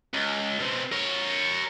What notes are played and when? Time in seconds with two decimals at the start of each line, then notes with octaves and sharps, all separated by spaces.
0.14 C#2
0.60 B2 C4
0.92 A#4 C#5